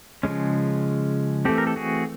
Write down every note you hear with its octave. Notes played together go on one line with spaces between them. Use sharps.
C#3 F3 G#3 C#4
E3 A3 C4 G4 A4
A#4
A4
F#4 G#4